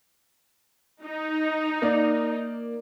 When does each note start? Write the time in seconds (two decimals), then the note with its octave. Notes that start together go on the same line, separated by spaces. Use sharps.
1.04 D#4
1.82 A#3 A#4 D5